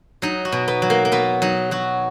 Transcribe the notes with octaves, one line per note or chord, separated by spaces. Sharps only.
F#3 D#4
F#4
B2
B3
F#3
A#3
A#3
B2 B3
F#3 D#4
F#3 F#4